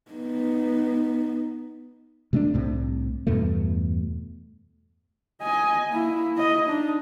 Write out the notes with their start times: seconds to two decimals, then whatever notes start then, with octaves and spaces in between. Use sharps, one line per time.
0.11 B3 D#4
2.33 C3 A3 B3 D4
2.54 C2 A2 C3
3.27 E2 G2 B2 A3
5.41 D#5 G#5
5.89 A#3 E4
6.36 E4 D#5
6.66 D4 D#4